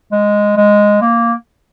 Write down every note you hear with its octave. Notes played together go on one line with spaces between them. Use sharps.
G#3
G#3
A#3